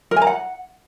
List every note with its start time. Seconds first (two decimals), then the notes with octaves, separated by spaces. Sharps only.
0.11 A#4
0.16 G#5
0.22 A#5
0.27 F#5